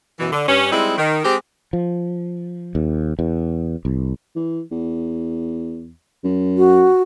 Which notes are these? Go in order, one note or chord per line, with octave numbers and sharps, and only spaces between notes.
F#2 B2 E3
D3
G2 C#4
G3 G#3 C4 D#4 E4
D#3
G#3 C4 G4
F3
D#2
E2
C2
E3
E2
F#2
F#4